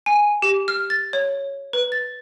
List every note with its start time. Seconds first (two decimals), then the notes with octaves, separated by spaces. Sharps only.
0.06 G#5
0.42 G4
0.68 F6
0.90 A6
1.13 C#5
1.73 B4
1.92 A6